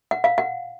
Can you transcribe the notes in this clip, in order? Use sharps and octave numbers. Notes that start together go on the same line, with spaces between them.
F#5
F5
F#5